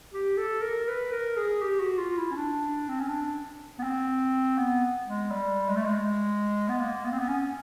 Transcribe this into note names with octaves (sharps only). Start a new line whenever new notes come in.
G4
A4
A#4
B4
A#4
G#4
G4
F#4
F4
E4
C#4
D4
C4
C#4
D4
B3
C4
B3
G#3
G3
G#3
A3
G#3
B3
A#3
B3
C4
B3
C#4